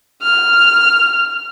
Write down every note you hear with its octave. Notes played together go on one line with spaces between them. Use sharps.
F6